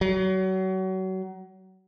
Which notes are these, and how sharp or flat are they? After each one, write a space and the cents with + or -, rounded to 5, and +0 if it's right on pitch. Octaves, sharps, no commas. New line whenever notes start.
F#3 +30